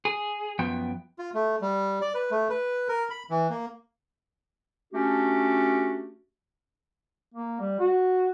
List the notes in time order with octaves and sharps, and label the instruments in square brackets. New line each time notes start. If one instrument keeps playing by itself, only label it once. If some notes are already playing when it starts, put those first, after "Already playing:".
[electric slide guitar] G#4
F#2 F3 B3 G5
[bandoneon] F4
A3
G3
D5
B4
A3
B4
A#4
B5
E3
A#3
[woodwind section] A3 C#4 D4 F#4 G4
[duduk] A#3
G3
F#4